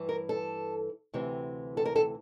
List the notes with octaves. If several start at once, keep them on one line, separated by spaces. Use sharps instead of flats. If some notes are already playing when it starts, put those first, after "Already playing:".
Already playing: G2 E3
A#4
A4
D2 C3 E3
A4
A#4
A4